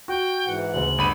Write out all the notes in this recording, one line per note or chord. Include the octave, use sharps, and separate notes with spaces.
F#4 G5
G#2 E3 F#5
D2 C#3 F#7
G1 F#5 B5 D#7